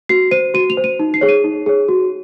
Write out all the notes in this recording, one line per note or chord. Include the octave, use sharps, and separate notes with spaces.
F#4 C7
C5 D#7
F#4 D#7
F7
C5
D#7
D#4
C7
G#4 C#5
D#7
D#4
G#4 C#5
F#4